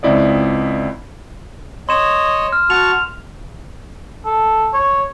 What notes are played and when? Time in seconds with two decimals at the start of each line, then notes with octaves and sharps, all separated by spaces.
0.03 C#2 C4 E4 D5 D#5
1.89 C#5 D#5 C6 E7
2.52 F6
2.70 F#4 A5 C#6 F7
4.25 A4
4.73 C#5